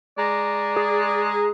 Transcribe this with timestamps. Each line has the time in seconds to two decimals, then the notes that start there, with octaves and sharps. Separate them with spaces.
0.18 G#3 D5 A#5
0.76 G#4